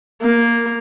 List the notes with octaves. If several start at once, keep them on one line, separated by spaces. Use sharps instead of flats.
A#3